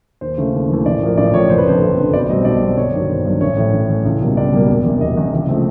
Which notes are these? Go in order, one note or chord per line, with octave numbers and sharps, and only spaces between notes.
D#2 C5
C#3 E3 A3
D#2
C#3 E3 A3
A1 D5
A2 F3 A#3
A1 D5
A2 F3 A#3 C#5
F#1 C5
B4
F2 D3 C5
F#1
F2 D3
B1 D5
B2 G3 C4 D#5
B1 D5
B2 G3 C4
G1 C#5
G2 D#3 F#3
G1 C5
G2 D#3 F#3
A1 C#5
A2 E3
A1
A2 E3
C#2
B2 G3 A#3
C#2 D5
B2 G3 A#3
E1
E2 C3
E1 D#5
E2 C3
C#2
C#3 F3 A3 C4